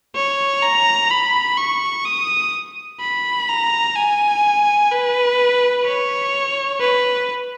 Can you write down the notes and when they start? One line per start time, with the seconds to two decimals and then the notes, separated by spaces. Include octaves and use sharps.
0.16 C#5
0.62 A#5
1.11 B5
1.57 C#6
2.05 D#6
3.01 B5
3.49 A#5
3.95 G#5
4.92 B4
5.86 C#5
6.81 B4